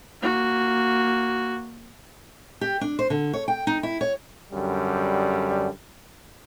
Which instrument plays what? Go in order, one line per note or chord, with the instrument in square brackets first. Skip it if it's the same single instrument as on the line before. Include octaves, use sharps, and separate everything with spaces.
[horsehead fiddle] A#3 F#4
[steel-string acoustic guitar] G4
D4
C5
D3
C#5
G5
D#4
E4
C#5
[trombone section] F#2 D3 G3